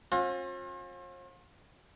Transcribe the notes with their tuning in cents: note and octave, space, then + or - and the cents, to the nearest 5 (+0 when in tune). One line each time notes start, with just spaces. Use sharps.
C4 +45 F4 +40